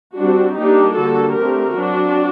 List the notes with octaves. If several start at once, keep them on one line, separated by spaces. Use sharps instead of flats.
G3 C4 D4 F#4
G3 A#3 D4 D#4 G4
D3 G3 A#3 F#4 A4
D3 A3 C4 G4 A#4
F#3 C4 D4 F#4